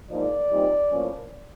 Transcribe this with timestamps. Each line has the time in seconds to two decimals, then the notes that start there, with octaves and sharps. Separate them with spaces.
0.10 G#2 F3 A#3 D#4 D5
0.51 A#2 G3 C4 D#4
0.91 A2 F3 A#3 C#4